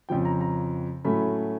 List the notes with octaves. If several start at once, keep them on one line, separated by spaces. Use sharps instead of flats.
F2 C#3 F3 G5
A#5
A#5
A2 F#3 A3 C#4 B5